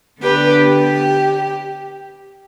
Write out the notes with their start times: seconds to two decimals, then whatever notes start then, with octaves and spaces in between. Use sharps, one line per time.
0.22 D3 B3 D4 G4 B4
0.64 G4